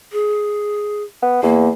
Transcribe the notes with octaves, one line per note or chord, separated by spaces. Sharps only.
G#4
B3
E2 A#3